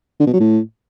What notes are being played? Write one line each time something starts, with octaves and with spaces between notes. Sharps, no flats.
D3
B2
F#3
A2